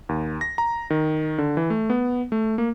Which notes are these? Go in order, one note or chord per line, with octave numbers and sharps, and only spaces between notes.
D#2
A#6
A#5
D#3
D3
E3
A3
B3
A3
A#3